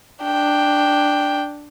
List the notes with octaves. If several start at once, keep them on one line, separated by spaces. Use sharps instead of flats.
D4 G5